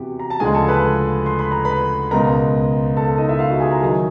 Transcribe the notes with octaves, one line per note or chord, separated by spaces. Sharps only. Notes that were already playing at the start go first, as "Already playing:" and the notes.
Already playing: E2 C3 E3 F#4 G4
A#5
A5
D2 C#3 F3 G#3 G#4 G#5
A4 A5
B4 B5
C6
B5
A#5
B4 B5
C#2 B2 G#3 A#4 A#5
A4 A5
A4 A5
D#4 D#5
E4 E5
F4 F5
F#4 F#5
G#4 G#5
A#4 A#5
D#3 F#3 G#4 G#5